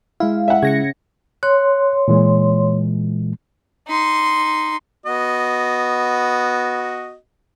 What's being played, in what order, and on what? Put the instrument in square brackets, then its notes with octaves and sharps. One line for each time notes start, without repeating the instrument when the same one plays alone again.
[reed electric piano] G#3 E4 [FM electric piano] F5
[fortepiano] E5 F#5
[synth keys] C#3 [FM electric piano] G#6 A#6 C#7
[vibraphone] C#5 C6 [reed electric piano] F#6
[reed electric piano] A#2 E3 G#3
[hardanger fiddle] D#4 C6
[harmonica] B3 F#4 D#5